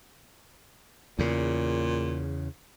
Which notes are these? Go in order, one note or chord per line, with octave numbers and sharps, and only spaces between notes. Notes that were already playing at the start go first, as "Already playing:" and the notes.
E2 A#2 C#3